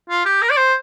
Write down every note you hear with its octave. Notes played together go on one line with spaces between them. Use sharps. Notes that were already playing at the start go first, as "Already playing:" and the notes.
F4
G4
A#4
D5
C5